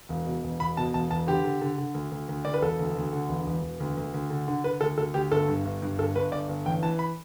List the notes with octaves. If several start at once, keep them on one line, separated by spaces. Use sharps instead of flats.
E1
B2
E1
E1 B5
B2 A5
E1 A5
E1 A5
D3 G4
D3
D3
D3
D2
D2
D2
D2 D5
B4
E1 A4
D2
D2
D3
E1
E1
E1
D2
D2
D2
D3
D3
D3 B4
D2 A4
D2 A4
D2 G4
G1 A4
G2
G1
G2
G1 A4
G1 B4
G1 D5
G1
A1 G5
E3 A5
B5